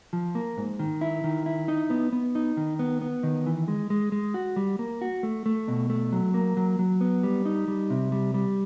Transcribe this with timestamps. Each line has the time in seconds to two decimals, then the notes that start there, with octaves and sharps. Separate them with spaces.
0.13 F3
0.35 A#3
0.57 G#2
0.79 D#3
1.01 E4
1.24 D#3
1.46 E4
1.68 D#4
1.90 B3
2.12 B3
2.35 D#4
2.57 D#3
2.79 B3
3.02 B3
3.23 D#3
3.46 E3
3.68 G#3
3.90 G#3
4.12 G#3
4.34 F#4
4.56 G3
4.79 A#3
5.01 F#4
5.23 A3
5.46 A3
5.68 B2
5.90 A3
6.12 F#3
6.34 A#3
6.57 F#3
6.79 F#3
7.01 B3
7.23 G3
7.46 D#4
7.68 G3
7.90 C3
8.12 G3
8.34 G3